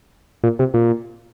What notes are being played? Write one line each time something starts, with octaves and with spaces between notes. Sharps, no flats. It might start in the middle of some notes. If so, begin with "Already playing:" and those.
A#2
C3
A#2